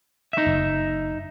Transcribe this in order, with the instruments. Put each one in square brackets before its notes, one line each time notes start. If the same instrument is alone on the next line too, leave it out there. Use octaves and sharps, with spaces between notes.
[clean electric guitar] D#4 E5
[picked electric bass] F#1